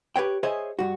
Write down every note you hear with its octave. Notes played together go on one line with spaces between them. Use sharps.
G4 B4 C#5 G5
G#4 C5 C#5 D#5 E5 G#5
G2 F#4